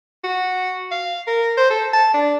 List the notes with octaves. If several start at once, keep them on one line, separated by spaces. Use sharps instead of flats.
F#4
F5
A#4
C5
A4
A5
D4